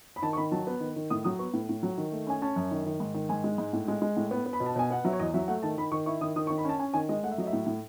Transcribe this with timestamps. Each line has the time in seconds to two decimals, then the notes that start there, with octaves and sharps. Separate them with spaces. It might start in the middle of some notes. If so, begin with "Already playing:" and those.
0.16 B5
0.22 D#3 A5
0.33 C#6
0.37 D#3 B5
0.52 F#3 A5
0.67 B3
0.80 D#3
0.96 D#3
1.10 A2 D#6
1.24 F#3 D#6
1.39 B3 C#6
1.54 A2
1.69 A2
1.83 F#3
1.98 D#3
2.12 A3
2.27 C#4 G#5
2.42 C#4 A5
2.56 F#2
2.71 D#3
2.86 D#3
3.00 G#2
3.14 D#3
3.29 G#2 G#5
3.44 G#3
3.58 G#2
3.73 A2
3.88 G#3
4.02 G#3
4.17 A2
4.31 B3
4.46 B3
4.53 B5
4.60 B2
4.66 A5
4.76 B2 G#5
4.90 B3 F#5
5.05 F#3 E5
5.13 C#5
5.19 E2 D#5
5.34 F#3 E5
5.48 A3 F#5
5.63 D#3 A5
5.77 D#3 B5
5.92 D#3 C#6
6.06 E4 C#6
6.21 D#3 D#6
6.36 D#3 D#6
6.47 C#6
6.50 D#3
6.58 B5
6.65 C#4 A5
6.79 C#4 G#5
6.94 D#3 G#5
7.09 G#3 D#5
7.23 A3 F#5
7.31 E5
7.38 F#3 D#5
7.47 E5
7.53 A2
7.67 A2